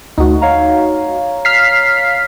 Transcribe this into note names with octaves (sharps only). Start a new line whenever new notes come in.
D2 A3 D#4 F#4
C#5 F5 A#5
F6 B6 C7